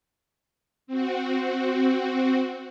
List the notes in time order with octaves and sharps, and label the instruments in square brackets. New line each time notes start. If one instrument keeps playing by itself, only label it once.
[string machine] C4 F#4